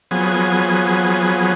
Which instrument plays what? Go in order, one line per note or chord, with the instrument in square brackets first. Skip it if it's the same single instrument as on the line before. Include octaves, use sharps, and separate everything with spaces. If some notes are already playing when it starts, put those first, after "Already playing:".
[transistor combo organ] F3 F#3 B3 G#4